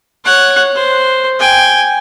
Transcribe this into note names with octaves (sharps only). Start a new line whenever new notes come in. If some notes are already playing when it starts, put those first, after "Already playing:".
C#5 F#5
C5
G5 G#5